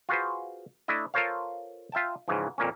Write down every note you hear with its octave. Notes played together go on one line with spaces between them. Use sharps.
F4 F#4 G#4 B4 C5
A3 D4 E4 D#5
F4 A4 A#4 C5 C#5 F5
F4 E5 G5 A5
G#2 C#3 E3 F3
F2 A#2 A#3 C#4